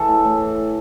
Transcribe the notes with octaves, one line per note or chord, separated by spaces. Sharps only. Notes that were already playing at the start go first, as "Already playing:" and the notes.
Already playing: E3 A4
A2
A2
E3